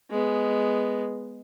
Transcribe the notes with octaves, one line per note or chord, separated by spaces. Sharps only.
G#3 B3